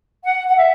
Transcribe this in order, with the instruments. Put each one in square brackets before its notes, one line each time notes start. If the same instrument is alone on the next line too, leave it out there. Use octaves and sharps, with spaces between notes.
[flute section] F#5
F#5
E5